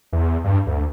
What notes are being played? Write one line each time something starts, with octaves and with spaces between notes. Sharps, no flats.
E2
G2
D2